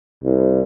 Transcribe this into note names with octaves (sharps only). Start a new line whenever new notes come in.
C2